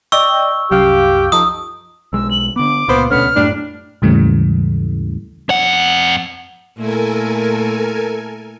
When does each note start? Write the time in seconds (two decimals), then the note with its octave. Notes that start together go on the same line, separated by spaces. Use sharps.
0.12 D5 D#5 G5 C#6 E6
0.71 C2 F#2 G4 F5
1.32 F3 D#4 A4 D#6
2.13 B1 G#3 E6
2.31 F#7
2.56 D3 B3 D6
2.88 C#2 A#2 B3 F4 C5
3.11 D2 B2 D3 B3 C#4 F6
3.36 F#2 A2 G3 A3 D4
4.02 D#2 G#2 C#3 E3 G3 A3
5.49 F2 F#5
6.77 A#2 A3 E4 A4 A#4 G#5